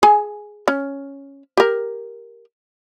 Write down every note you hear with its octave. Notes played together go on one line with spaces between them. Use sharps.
G#4 G#5
C#4
G4 A#4